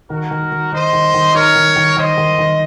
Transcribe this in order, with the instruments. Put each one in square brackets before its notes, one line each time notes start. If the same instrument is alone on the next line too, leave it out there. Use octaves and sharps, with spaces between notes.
[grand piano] D#3 [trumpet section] F#4 A#4
[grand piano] D#3
D#3
[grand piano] D#3 [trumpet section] C5 D#5
[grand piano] D#3
D#3
[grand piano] D#4 [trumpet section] A#4 C#5
[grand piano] D#3
D#3
[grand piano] D#3 [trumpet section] C5 D#5
[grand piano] D#3
D#3